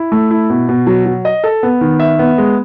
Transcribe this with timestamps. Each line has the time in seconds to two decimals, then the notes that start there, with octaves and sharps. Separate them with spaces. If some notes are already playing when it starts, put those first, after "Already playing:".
Already playing: E4
0.12 A3
0.31 E4
0.50 B2
0.69 B2
0.87 F#3
1.06 F#3
1.25 D#5
1.44 A4
1.63 B3
1.81 D#3
2.00 E5
2.19 B3
2.38 G#3